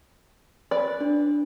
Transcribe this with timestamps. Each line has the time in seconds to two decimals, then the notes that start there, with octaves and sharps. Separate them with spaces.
0.71 B4 D5
1.01 D4